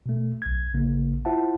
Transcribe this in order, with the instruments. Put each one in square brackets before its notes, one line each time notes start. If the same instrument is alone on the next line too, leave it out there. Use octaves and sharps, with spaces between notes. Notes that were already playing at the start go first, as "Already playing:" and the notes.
[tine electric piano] B2 A3
B1 G#6
A1 C#3 A#3
E4 F4 C5 E5 F#5 A5